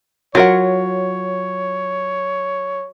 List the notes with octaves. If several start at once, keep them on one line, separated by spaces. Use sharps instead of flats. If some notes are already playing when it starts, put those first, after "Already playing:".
F#3 F4 A#4 C#5 F#5